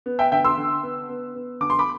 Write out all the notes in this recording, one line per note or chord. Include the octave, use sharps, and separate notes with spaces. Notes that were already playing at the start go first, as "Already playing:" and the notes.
B3
E5 G5
D3 E5 G5
C6 E6
D3
B3
B3
B3
D3 D6
C6
B5 D6